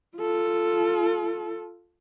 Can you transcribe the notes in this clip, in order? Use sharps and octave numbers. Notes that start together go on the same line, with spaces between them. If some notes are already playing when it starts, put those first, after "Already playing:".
F4 A4